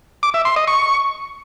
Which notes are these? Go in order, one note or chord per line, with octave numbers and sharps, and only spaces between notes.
D6
E5
C6
D#5
C#6